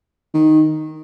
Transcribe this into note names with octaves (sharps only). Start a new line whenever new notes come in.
D#3